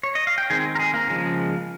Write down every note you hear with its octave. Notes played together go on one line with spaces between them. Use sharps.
C#5
D#5
F5
G5
D#3 G#3 C4 G#4 G#5
A#4
G#4
A#3 A#4
C#3 F3 G#3